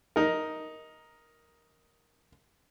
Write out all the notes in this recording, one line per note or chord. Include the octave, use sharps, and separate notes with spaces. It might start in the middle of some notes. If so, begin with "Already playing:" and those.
D#4 A#4